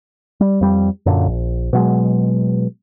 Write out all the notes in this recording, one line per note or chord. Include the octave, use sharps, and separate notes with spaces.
G3
F2 G3
F#2 A#2 D3
A#1
B2 F#3 G#3